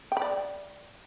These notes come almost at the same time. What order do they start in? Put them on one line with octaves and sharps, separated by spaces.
G5 B5 D5